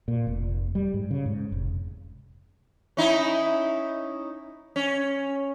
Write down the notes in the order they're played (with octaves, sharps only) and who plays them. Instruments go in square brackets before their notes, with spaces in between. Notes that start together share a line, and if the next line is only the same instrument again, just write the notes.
[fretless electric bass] A#2
F1
G3
G#2
C#3
G#2
F1
[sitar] C#4 D#4 E4
C#4